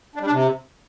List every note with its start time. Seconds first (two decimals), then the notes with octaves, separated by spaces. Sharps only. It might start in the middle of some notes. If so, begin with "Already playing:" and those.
0.16 D4
0.21 G3
0.26 D4
0.31 C3